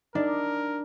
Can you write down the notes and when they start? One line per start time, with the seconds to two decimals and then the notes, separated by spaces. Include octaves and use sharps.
0.15 D4 D#4 A#4 D5